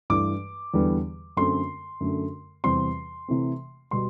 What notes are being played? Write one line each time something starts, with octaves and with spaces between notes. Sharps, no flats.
G2 E3 A3 D6
E2 D3 G3 B3
F#2 D3 A3 C4 C6
F#2 D3 A3
E2 C3 G3 C4 C6
C3 E3 A3 C4
B2 G3 B3 C6